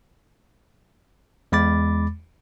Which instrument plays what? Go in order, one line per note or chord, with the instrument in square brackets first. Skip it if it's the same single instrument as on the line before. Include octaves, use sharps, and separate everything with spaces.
[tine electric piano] E2 G#3 B5 D6 A6